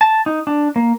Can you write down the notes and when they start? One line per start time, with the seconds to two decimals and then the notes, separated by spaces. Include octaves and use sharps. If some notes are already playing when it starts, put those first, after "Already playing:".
0.01 A5
0.26 D#4
0.47 D4
0.76 A#3